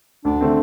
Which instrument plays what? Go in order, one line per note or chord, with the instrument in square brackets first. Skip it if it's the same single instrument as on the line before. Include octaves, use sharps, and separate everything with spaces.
[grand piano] D2 [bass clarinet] D4
[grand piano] D3 A3 C4